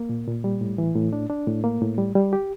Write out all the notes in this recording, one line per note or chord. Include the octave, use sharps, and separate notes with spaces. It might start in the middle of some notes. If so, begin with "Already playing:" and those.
Already playing: A#3
A#2
A#2
G3
A2
E3
A2
D4
D4
A2
A#3
A2
G3
G3
G4